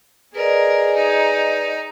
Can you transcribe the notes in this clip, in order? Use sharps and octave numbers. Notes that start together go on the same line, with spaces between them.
G#4 A#4 B4 D5 D#5
D#4